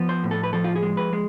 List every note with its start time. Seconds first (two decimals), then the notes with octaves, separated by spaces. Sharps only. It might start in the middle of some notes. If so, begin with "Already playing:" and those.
Already playing: F3 B3
0.09 C5
0.24 A2
0.31 A4
0.43 B4
0.53 F3 A4
0.64 F4
0.76 G#4
0.83 G#3
0.97 B4
1.13 G#3